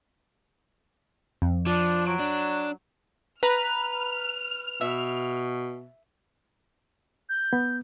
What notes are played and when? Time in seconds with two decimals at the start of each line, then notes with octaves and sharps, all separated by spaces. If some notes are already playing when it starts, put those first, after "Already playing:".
1.42 F2
1.67 F3 D4
2.07 F#3 D7
2.19 D4
3.43 B4 A#5 F6
4.81 B2 E5
7.29 G6
7.53 B3